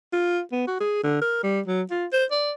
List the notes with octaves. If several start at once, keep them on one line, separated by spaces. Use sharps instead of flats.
F4
B3
F#4
G#4
D3
A#4
G3
F#3
F4
C5
D5